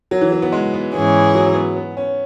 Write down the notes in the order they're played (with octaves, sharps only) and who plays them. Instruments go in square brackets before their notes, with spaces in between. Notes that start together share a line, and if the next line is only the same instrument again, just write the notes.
[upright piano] F#3
E3
F#3
B3
G#3
B3
[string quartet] G#2 E3 C#4 G#4 [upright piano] B3
[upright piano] F#3
B3
B3
C#4